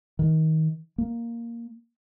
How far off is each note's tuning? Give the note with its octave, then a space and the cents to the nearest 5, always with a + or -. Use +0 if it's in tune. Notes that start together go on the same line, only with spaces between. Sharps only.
D#3 +25
A#3 +0